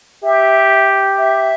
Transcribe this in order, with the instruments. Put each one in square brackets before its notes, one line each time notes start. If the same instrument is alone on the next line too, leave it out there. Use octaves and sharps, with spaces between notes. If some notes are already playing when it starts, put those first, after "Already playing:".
[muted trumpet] G4 [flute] E5
[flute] E5